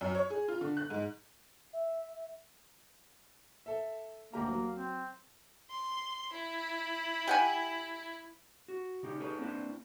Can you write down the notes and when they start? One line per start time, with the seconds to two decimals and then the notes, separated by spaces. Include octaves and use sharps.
0.01 F#2
0.15 C#5
0.30 G#4
0.48 F4
0.61 D3
0.77 F#6
0.90 G#2
1.73 E5
3.66 A4 E5
4.33 D2 A#3 G4 A#5
4.48 F#3
4.76 C4
5.70 C6
6.33 E4
7.28 G4 F#5 G#5
8.68 F#4
9.03 C#3 D#4 G4
9.20 D#4 G#4 A4 B4 C#5
9.39 A#3 C4 D4 E4 B4 C5